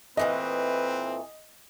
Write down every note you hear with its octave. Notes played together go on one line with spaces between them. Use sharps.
A#2 E3 A3 C4 B4 D#5